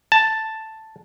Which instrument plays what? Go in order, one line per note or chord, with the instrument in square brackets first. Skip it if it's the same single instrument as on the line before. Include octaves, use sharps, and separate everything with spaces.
[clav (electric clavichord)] A5